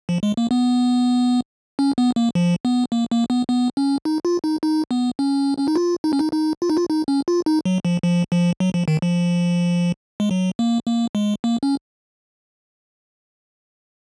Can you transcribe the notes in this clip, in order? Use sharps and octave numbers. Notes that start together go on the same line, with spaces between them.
F3
G#3
A#3
B3
C#4
B3
A#3
F3
B3
A#3
A#3
B3
B3
C#4
D#4
F4
D#4
D#4
B3
C#4
C#4
D#4
F4
D#4
C#4
D#4
D#4
F4
D#4
F4
D#4
C#4
F4
D#4
F#3
F3
F3
F3
F#3
F3
D#3
F3
G#3
F#3
A#3
A#3
G#3
A#3
C#4